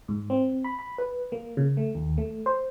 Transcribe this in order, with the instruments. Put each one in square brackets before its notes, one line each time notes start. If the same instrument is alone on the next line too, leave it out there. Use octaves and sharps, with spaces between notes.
[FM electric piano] G#2
C4
B5
B5
B4
A#3
C#3
A3
D#2
A3
C5